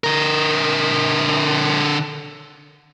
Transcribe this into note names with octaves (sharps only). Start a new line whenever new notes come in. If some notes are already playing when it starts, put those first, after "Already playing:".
D3 A#4